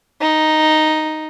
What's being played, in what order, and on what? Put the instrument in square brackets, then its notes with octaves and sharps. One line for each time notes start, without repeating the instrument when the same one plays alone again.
[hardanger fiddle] D#4